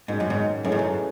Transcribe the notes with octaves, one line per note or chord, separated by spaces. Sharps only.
G#2 D#3 F#3 C#4
F#2
G#2
F#2 E3 A3 C#4 G#4
G#2
F#2